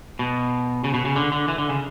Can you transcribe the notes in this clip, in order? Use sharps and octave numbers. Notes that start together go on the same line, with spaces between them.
B2
C#3
B2
C#3
D3
D3
E3
D3
C#3